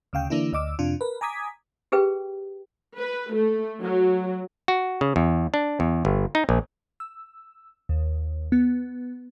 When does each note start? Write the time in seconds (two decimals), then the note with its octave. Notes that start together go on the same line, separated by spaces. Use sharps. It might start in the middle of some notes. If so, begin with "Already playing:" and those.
0.13 D2 C#3 F5 G5
0.30 D3 E3 A#3 D4 E4
0.53 D2 D#5 D6 E6
0.79 F2 C3 D4 F4
1.01 A#4 B4
1.21 G#5 A#5 D6 D#6 G#6 B6
1.92 G4 G#4 B4 G5
2.97 B4
3.33 A3
3.82 F#3
4.68 F#4
5.01 C#3
5.16 E2
5.54 D4
5.80 E2
6.05 G1
6.35 D#4
6.49 A#1
7.00 E6
7.89 D#2
8.52 B3